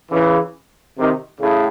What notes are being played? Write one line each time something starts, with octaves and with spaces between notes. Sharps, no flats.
C#3 E3
C3 D#3
A2 C#3